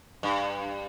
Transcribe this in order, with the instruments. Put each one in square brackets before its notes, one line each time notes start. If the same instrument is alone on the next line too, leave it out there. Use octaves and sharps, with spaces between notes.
[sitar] G2